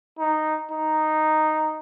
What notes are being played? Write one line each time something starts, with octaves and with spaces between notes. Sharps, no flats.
D#4
D#4